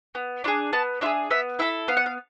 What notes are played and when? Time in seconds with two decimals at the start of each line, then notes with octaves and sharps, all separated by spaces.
0.15 B3
0.44 D4 F4 G#4
0.73 B3 A5
1.01 D4 F4 E5
1.06 G#4
1.30 B3 E5
1.59 E4 A4 E5
1.88 B3 F5
1.97 F#5
2.06 F5